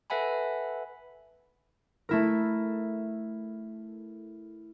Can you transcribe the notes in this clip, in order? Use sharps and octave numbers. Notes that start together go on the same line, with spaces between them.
A4 B4 E5 F#5 G#5 B5
A3 E4 A#4